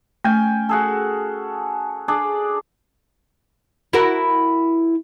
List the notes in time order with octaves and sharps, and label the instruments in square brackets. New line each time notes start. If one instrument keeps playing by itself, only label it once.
[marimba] A3 [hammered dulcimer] C#4 G5 G#5
[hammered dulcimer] F#4 G#4 A4
D4 G#4 D5
[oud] E4 F#4 A#4